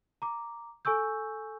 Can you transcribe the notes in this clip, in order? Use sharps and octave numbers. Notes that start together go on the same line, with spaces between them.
A#5 D6
A4 G#5 C#6 E6 G6